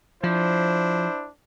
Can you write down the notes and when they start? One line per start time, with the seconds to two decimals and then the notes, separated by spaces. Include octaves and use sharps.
0.23 F3 D4 E4 C5